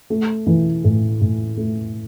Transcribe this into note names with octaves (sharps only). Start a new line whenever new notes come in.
A3
E3
A2
A2
A3